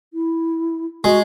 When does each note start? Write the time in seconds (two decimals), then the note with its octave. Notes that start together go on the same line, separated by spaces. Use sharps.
0.14 E4
1.04 G#3 F#4